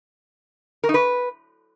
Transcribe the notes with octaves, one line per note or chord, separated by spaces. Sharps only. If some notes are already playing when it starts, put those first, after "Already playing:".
A#4
D#4
B4